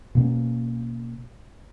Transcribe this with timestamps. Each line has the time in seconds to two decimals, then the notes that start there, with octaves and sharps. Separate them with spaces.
0.15 B2 A#3 C#4